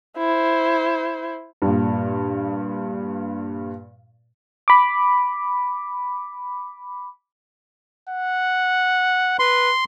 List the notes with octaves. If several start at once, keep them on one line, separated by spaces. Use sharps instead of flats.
E4 C5
G2 A#2
B5 D6
F#5
B4 C6